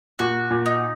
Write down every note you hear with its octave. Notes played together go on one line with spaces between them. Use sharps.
A#2 F#4
A#2
D#4